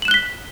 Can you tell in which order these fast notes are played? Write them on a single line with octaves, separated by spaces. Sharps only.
F#7 E7 F#6 G7 B6